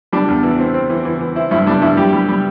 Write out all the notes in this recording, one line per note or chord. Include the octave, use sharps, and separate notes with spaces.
G3 D4
E2
E3
C4
C4
E3
E3
E3
C4 E4
G2 E4
G3 D4
G2 E4
G3 G4
G3
G3